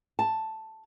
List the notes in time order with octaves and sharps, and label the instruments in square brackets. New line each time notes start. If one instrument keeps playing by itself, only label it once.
[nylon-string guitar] A5